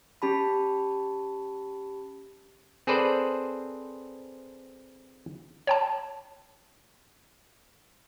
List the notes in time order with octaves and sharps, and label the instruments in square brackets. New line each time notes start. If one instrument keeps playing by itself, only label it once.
[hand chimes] C#4 G4 A5 B5
[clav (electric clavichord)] C4 G#4 A4 B4 C5 D5
[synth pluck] C#5 G5 A5